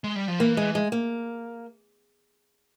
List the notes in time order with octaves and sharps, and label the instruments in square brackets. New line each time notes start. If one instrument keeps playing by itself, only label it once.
[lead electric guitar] G#3
G3
F3
[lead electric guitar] E3 [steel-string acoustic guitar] A#3
[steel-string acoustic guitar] G#3
G#3
A#3